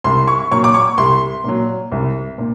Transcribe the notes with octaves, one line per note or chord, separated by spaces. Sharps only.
C2 C6
C#6
A#2 F#3 C#6
D6
C#6
C2 C6
A#2 F#3
C2
A#2